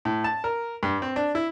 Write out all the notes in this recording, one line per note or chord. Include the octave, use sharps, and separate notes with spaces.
A2
A5
A#4
G2
C4
D4
E4